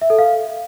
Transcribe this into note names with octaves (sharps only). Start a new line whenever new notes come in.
E5
A4
F5